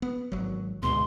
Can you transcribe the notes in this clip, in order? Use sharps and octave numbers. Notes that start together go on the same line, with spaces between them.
B3
G#1 F#3
D2 G#2 B2 C6